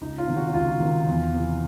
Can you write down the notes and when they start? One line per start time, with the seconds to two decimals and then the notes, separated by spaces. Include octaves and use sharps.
0.01 C#2 D#4
0.18 F4
0.27 C3 D#3
0.37 F#4
0.48 F#4
0.53 C#2 F4
0.80 C3 D#3
1.07 E2
1.34 C3 E3